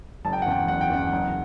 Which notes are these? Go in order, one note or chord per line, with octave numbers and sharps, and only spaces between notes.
F#1 A5
G5
F#5
E2 C#3 G5
F#1 F#5
G5
E2 C#3 F#5
F#1